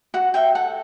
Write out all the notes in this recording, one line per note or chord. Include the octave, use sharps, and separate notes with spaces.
F#4 F#5
E5 G5
A4 F#5